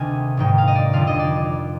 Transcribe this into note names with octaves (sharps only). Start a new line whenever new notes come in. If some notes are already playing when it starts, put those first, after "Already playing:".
Already playing: D2 C3 D#3 G#3 G#5
G#1 G#2 D#3 G#3 G5
F5
D#5
D5
F1 F2 D3 F3 F5
D#5
D5